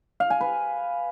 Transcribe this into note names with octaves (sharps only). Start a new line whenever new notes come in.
F5
G#5
B4